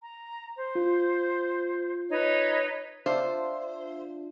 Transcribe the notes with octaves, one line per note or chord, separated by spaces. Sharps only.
A#5
C5
F4
D#4 B4 C#5
D4 F4 C5 E5